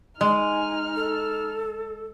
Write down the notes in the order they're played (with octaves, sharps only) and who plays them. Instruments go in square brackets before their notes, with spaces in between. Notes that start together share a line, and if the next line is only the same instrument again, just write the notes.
[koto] G#3 [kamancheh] D#4 F6 [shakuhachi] G#5
[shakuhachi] A4